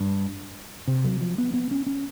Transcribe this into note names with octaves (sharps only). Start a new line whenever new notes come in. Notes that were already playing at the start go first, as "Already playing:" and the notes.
Already playing: G2
C3
F#3
F3
B3
B3
C#4
C#4